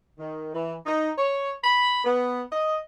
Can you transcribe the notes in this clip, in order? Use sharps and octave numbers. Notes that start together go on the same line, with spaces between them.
D#3
E3
D#4
C#5
B5
B3
D#5